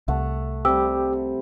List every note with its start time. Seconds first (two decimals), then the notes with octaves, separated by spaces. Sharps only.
0.08 C2 A3 F#5
0.65 C3 G3 G4 E6